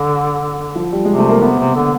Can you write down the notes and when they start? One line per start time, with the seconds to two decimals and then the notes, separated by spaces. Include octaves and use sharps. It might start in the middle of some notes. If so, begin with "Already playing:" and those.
Already playing: D3
0.75 F3
0.92 G3
1.05 C3 G#3
1.18 A3
1.29 A#3
1.42 C3 B3
1.59 C3
1.75 D3